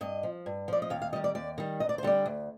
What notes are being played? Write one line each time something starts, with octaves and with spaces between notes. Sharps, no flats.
G2 D#5
F3
G2
F3 D5
D#5
D#2 F5
F5
D#3 G3 D#5
D5
D#2 D5
D#3 G3
D2 D#5
D5
C5
D3 G3 D5
D2